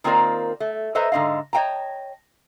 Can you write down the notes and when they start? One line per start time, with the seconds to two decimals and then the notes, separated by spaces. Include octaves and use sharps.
0.04 D#3 A#3 C4 F4 A#4 D5
0.60 A3
0.95 A4 B4 C5 D#5 E5 A#5
1.12 G#2 D3 F3 D#5 F5
1.53 C#5 D#5 F#5 G5 A5 A#5